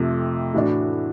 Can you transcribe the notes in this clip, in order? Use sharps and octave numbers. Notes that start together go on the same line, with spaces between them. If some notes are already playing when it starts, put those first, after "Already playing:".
Already playing: F2 C3 F3 A3
A2 E3 A3 D4 F#4